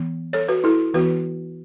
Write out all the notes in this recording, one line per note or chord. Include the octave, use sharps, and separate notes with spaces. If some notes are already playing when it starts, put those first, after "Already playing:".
Already playing: E3 B3
A4 C#5
F#4 B4
E4 A4
E3 B3 F#4 B4